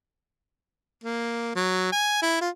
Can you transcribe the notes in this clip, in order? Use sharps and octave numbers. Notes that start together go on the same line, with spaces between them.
A#3
F#3
G#5
E4
F4